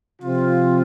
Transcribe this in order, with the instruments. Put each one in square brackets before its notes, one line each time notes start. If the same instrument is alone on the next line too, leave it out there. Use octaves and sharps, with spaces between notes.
[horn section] C3 F3 C4 F4